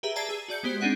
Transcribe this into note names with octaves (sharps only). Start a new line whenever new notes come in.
G4 G#4 B4 E5 A#5
D5 E5 A5 A#5 G#6 C7
G#4 E6
F#4 D5 G6 C#7
G#3 B3 G4 C5
C4 D4 D#4 G#4 F#5